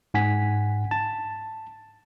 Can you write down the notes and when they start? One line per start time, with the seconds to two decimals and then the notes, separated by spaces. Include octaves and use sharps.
0.14 G#2 F#5 G#5 B6
0.91 A5